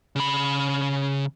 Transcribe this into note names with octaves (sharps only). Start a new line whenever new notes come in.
C#3 B5